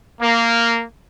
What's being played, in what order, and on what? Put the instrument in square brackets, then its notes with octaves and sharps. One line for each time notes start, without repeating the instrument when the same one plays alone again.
[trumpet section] A#3